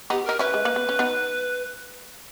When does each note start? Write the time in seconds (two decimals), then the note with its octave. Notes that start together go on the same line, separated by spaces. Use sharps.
0.10 B3 D#4 G4
0.25 D#4 A#4
0.39 C#4 E4 B4
0.54 G#3
0.65 A#3
0.76 B3
0.89 C#4
0.99 B3 D#4